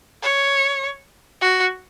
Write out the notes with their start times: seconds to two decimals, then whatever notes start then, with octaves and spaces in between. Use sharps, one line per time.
0.22 C#5
1.41 F#4